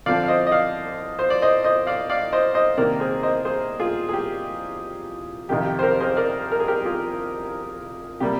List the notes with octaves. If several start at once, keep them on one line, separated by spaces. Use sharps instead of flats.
D3 F3 C4 D5 F5
F5
C5 D#5
D#5
D5 F5
C5
D5
C5 D#5
C5 D#5
D5 F5
D5 F5
C5 D#5
C5 D#5
C3 D#3 A#3 A#4 D5
G#4 C5
C5 D#5
G#4 C5
F4 G#4
G#4
G4
F2 C3 D#3 G4
G4
C5
G4 A#4
G#4 C5
A#4 D5
A#4
G#4
G4 A#4
F4 G#4
C3 G3 A#3 G4